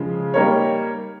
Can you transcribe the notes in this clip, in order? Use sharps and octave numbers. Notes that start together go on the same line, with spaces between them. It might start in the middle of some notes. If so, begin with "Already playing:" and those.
Already playing: C#3 F3 G#3
G3 A#3 D#4 A#4 C#5